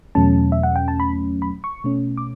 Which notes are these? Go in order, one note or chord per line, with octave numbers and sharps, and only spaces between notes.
E2 B2 F#3 A3 C#4 A5
E5
F#5
G5
A5
B5
B5
C#6
B2 A3 C#4
D6